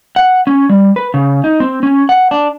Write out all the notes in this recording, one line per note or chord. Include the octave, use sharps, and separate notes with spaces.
F#5
C#4
G3
B4
C#3
D#4
C4
C#4
F#5
D4